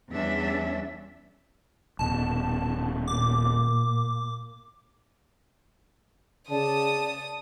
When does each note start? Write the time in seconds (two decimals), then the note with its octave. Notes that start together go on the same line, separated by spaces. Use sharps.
0.11 E2 G3 C#4 D4 E5
1.99 D#1 B2 A5
3.07 A#2 D6
6.50 C#3 D5 A5 D#6